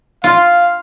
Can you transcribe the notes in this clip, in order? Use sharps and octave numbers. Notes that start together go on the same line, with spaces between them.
F4 F5